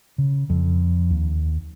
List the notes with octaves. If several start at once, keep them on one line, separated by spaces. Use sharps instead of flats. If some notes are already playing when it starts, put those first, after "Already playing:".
C#3
F2
D#2